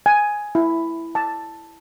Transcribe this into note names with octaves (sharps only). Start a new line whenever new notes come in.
G#5
E4
A5